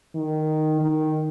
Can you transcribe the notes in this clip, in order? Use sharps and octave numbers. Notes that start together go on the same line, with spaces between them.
D#3
D#3